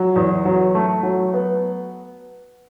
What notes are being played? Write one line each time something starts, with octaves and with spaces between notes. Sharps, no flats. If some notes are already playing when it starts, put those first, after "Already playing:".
Already playing: F#3
E2
F#3
A3
F#3
B3